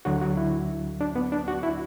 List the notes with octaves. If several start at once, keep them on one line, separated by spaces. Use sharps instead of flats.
D2 D3 F#3 F#4
F#4
E4
D4
B3
D4
F#4
E4